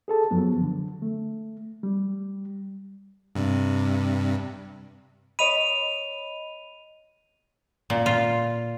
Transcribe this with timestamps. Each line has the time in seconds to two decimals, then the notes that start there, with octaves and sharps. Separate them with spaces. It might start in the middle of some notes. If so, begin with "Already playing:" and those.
0.08 G#4 A4 A5
0.31 F#2 F3 F#3 B3
0.61 D3
1.02 A3
1.83 G3
3.35 G2 C3
5.39 C#5 D#5 B5 D#7 F7
7.90 A#2
8.06 F4